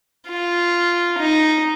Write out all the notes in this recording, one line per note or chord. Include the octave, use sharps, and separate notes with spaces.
F4
D#4